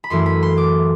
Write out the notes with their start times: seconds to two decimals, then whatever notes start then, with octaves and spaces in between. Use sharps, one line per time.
0.04 B5
0.10 F#2 E3 A3 E4 C6
0.26 B5
0.43 C6
0.58 D6